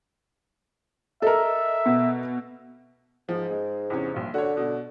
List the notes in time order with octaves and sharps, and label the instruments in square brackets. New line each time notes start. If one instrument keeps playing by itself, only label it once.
[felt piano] A4 A#4 [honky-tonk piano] D#5 [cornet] E5
[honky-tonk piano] B2
[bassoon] G#2 [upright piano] F3
[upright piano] G#3
E2 C3 C#4
A#1 G2
[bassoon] D3 [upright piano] F#4 C#5
[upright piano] B2